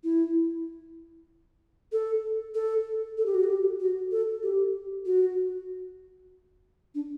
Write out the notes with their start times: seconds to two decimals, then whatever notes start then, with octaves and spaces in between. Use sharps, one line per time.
0.04 E4
1.92 A4
2.54 A4
3.18 A4
3.26 G4
3.34 F#4
3.44 G4
3.80 F#4
4.12 A4
4.43 G4
5.06 F#4
6.95 D4